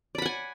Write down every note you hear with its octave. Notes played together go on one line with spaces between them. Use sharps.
D5 F#5 G#5 B5